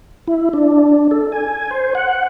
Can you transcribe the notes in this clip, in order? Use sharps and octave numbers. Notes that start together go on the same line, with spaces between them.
E4
D4
A4
G#5
C5
F#5